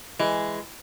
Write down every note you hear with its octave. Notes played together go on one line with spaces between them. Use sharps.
E3 G#3